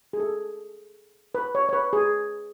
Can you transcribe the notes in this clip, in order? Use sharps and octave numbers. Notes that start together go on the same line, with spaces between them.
G#4
A4
B4
C#5
C#5
B4
G#4